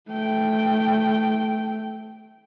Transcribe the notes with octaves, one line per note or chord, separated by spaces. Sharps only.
A3 G5